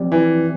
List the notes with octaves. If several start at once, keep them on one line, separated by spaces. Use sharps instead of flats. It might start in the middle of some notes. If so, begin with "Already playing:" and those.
Already playing: F3 C4 G4 D5
E3